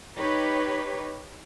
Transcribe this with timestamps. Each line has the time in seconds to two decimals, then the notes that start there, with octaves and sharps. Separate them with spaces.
0.16 D#4 G4 B4 C#5